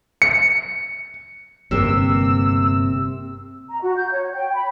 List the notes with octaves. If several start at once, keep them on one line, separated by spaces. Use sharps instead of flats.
C#7
G1 G2 C3 A#3 C4 E6
A#5
F#4
G6
C#5
G5
B5